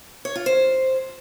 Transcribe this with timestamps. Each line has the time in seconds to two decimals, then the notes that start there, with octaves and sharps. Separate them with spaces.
0.25 C#5
0.35 F4
0.46 C5